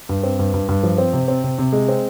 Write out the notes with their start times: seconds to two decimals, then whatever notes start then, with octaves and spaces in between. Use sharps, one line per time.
0.09 G2
0.23 C4
0.39 G2
0.54 G2
0.68 G2
0.83 F3
0.98 C4
1.13 C3
1.28 C4
1.44 C3
1.59 C3
1.73 G#3
1.89 C4